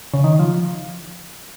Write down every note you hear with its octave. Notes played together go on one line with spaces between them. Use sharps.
C#3
D#3
F3